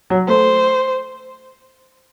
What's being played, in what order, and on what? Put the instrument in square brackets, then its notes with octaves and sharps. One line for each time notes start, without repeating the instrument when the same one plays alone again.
[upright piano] F#3
[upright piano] A3 [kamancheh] C5